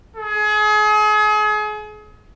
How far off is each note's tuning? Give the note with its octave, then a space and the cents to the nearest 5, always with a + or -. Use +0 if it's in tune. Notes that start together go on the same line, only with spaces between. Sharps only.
G#4 +35